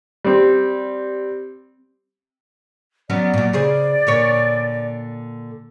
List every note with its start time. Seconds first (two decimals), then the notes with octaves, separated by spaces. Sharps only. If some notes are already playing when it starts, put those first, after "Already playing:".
0.25 G3 C4
3.10 F#3 B3 C#4 D5
3.34 A#2 F#3
3.53 C#3 G#4 C5 D5
4.07 A#2 D3 C#5